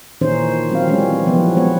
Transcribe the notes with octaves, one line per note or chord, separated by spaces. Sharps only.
A#2 D#3 E3 C#4 D#4 C5
F#3 C4 F5
E3 G3 G#3 C4 C#4
C4
C3 E3 F3 B3
G#3 B3 C#5